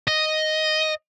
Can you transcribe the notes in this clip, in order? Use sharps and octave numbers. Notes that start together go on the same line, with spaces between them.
D#5